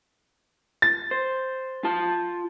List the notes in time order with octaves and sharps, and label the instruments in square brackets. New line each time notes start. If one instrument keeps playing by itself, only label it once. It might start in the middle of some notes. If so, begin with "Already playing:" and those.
[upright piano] A6
[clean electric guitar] C5
F4 A5